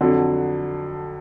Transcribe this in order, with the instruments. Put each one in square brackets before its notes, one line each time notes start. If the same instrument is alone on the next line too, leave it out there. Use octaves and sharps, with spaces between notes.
[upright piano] F2 D3 F#3